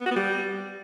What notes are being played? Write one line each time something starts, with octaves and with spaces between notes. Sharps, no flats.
B3
F#4
B3
G3